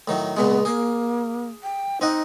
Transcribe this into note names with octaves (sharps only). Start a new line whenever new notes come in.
A2 D#3 F#3
C#2 A#2 G#3 B3
A#3 G#4
G5
C4 D#4 D#5 F#5